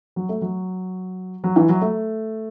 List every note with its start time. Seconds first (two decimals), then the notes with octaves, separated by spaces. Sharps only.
0.16 F#3
0.29 A3
0.42 F#3
1.44 F#3
1.56 E3
1.69 F#3
1.82 A3